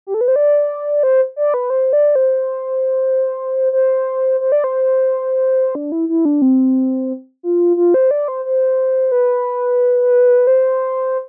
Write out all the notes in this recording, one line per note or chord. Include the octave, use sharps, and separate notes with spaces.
G4
A4
B4
C5
D5
C5
D5
B4
C5
D5
C5
C5
C5
D5
C5
D4
E4
E4
D4
C4
F4
F4
C5
D5
C5
C5
B4
C5